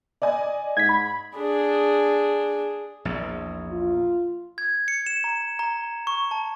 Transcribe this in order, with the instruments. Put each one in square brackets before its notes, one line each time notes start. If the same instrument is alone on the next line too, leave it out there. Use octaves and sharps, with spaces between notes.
[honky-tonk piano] D5 D#5 G#5
[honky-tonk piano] G#2 [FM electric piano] G#6 B6
[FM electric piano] B5
[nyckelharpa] D4 G#4
[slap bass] A#1 E2
[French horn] F4
[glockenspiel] G#6
C#7
E7
A#5
A#5
C#6
A5